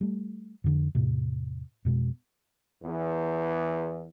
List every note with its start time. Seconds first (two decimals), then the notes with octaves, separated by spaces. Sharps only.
0.01 G3 A3
0.64 F2 D3
0.95 E2 A2 C3
1.85 F2 B2 G#3
2.83 E2